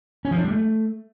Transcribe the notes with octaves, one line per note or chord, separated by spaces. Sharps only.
C#4
F3
D4
G3
A3